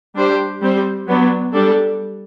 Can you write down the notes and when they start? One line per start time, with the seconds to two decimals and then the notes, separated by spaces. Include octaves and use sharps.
0.15 G3 D4 G4 C5
0.61 G3 C4 G4 C5
1.08 F#3 B3 D4
1.54 G3 D4 A4